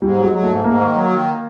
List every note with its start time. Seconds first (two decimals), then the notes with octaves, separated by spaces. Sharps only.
0.01 G#2 G3
0.17 F#3
0.23 G#3
0.32 F#3
0.43 A3
0.48 G#2
0.64 G#2 A#3
0.80 D#3
0.95 F#3
1.10 D#3